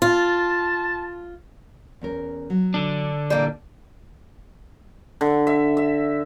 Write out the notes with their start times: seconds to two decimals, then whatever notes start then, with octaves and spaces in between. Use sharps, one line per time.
0.02 F4 A5
2.02 E2 C#4 A#4
2.50 F#3
2.74 D3 D4
3.30 A#2 E3 G3 A#3
5.21 D3
5.47 E5
5.77 E5